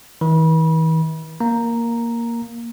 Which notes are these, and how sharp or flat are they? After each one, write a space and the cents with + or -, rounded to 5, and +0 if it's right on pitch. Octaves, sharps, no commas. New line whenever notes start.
E3 -45 B5 -30
A#3 +0 A#5 +0